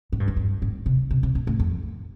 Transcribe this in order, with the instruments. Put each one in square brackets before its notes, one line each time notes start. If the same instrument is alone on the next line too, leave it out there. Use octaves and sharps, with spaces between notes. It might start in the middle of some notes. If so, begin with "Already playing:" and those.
[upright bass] A2
G2
F2
G2
A2
C3
C3
C3
A#2
A2
F2